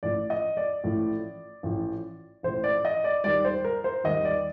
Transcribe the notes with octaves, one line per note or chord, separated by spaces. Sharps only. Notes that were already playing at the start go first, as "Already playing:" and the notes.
A1 A2 F3 D5
D#5
D5
A1 A2 F3
A1 A2 F3
A1 A2 F3 C5
D5
D#5
D5
D#2 D#3 G3 D5
C5
A#4
C5
D#2 D#3 G3 D#5
D5